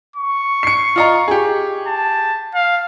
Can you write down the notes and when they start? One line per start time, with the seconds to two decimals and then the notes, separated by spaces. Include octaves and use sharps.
0.16 C#6
0.63 C7 C#7
0.96 F4 D#5 A#5
1.28 G4 G#4
1.87 A5
2.54 F5